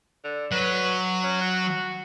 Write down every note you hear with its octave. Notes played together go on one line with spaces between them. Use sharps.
D3
F#3 B4
C#4
F#4